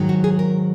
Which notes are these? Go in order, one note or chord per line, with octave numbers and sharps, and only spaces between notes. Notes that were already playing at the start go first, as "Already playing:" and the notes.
Already playing: G#2 D#3 F#3
F#4
G#4
A#4